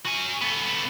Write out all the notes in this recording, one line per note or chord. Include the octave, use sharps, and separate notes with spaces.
F#4 G#5
B3 A4